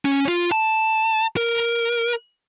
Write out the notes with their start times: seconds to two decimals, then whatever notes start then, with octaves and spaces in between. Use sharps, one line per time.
0.05 C#4
0.28 F4
0.52 A5
1.37 A#4